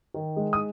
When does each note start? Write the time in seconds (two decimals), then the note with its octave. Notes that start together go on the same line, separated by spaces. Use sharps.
0.14 D#3
0.36 G#3
0.53 D#6